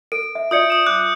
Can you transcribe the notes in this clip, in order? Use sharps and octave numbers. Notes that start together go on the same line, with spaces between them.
A4 D7
E5
F4 D5 E5 D#6 G6 C#7
D#6 E7
D6 F#6